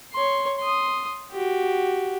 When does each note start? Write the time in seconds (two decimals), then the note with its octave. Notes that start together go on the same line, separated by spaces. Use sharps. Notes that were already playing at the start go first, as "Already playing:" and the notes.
0.13 C#5 C6
0.58 C6 D#6
1.31 F#4 G4